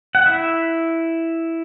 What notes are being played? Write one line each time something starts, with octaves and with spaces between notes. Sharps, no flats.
F#5
E4 E5